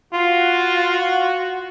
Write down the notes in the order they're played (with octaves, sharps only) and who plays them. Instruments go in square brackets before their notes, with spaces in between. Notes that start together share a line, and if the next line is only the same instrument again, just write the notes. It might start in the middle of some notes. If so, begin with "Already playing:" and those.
[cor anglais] F4 [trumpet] F#4